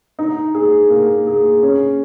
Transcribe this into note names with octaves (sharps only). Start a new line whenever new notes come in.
D#4
G#4
A#3
G#4
C#4